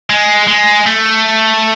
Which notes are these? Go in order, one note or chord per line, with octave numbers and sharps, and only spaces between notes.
G#3
G#3
A3